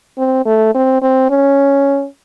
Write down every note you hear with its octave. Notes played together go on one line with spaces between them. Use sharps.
C4
A3
C4
C4
C#4